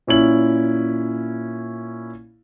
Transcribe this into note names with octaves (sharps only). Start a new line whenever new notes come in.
A#2 C#4 E4 F#7